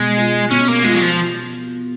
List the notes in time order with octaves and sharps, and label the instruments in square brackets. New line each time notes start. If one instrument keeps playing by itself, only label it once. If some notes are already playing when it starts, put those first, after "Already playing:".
Already playing: [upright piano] B2 [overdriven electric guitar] G#3
[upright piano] F4
[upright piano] B2 [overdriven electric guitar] C#4
[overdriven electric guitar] A#3
[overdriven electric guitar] G#3 [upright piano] F4
[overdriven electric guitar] F#3
F3